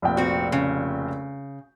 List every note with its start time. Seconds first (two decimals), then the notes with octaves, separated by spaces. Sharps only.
0.02 F1 A#1 G5
0.17 C4 F#4
0.52 C#3